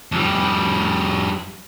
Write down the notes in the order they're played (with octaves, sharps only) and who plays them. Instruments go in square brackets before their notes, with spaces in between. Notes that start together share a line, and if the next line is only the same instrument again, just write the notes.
[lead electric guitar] F2 G3